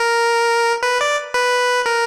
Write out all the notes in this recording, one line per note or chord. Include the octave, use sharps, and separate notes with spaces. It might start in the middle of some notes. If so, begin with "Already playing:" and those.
Already playing: A#4
B4
D5
B4
A#4